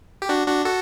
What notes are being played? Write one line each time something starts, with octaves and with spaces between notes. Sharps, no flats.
G4
D4 F#4
D4 F#4
F#4 A4